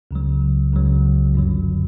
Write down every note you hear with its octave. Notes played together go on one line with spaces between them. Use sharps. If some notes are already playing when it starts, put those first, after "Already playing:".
C#2 C#3 F#3
C#2 C#3 F#3
G1 F#2 D3 F#3